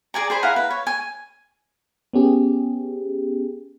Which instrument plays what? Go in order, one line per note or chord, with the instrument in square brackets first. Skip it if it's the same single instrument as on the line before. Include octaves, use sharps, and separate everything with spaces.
[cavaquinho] G#4 D5 G#5 A#5
G#4 C5 B5
E4 F5 F#5 A#5
B4
C#5
G#5
[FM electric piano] B3 C#4 G4 G#4